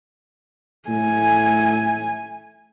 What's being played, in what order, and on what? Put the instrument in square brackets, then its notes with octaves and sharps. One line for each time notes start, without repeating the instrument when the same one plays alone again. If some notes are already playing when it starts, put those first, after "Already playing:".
[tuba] A2 [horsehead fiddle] A3 G#5